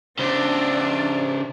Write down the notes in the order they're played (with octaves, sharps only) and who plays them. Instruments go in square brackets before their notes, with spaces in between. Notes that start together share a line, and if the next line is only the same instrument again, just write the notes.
[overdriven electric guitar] C#3 C5 [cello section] D4